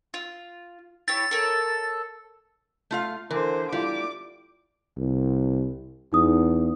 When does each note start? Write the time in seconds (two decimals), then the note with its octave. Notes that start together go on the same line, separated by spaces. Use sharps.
0.14 F4
1.08 E4 G4 C#5 A6
1.31 A4 A#4 C#5
2.91 A3 F4 F5
3.31 D3 E3 A#4 C5 D6
3.72 G3 E4 F4 D6
4.97 C2
6.13 E2 D#4 D#6